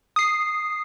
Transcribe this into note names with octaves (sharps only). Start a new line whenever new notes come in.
D#6 C7